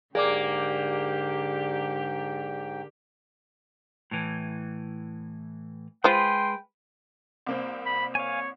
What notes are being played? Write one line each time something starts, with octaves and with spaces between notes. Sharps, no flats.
G#2 D3 A#3 G4 G#4 D5 G5 D6
A2 E3
G#3 F4 G#4 B4 C5 G5 C6
C2 A#3 C4
B5
C#5 F5 G#5